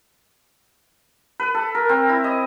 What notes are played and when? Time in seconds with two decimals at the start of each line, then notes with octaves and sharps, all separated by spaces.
1.40 B4
1.55 A4
1.75 A#4
1.89 C4
2.09 E4
2.24 D#5